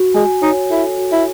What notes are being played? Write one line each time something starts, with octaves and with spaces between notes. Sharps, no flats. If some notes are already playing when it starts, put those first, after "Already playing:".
Already playing: F#4
G#3 G#5
D#4 C#5
E4 A4
F#4
E4